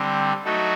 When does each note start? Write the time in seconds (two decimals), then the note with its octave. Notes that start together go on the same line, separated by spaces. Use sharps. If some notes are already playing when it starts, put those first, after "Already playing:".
Already playing: D3 G3 C4 G4
0.45 F#3 A3 D#4 F#4 A4